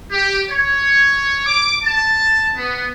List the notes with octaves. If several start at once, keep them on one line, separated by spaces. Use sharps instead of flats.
G4
C#5
D6
A5
B3